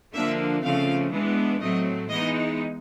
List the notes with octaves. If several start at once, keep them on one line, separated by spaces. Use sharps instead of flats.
D3 F3 A#3 D4 E5
C#3 F3 A3 C4 F5
E3 G#3 B3 D4
A2 F#3 A3 C4 D#5
E3 G#3 B3 D#4 D#5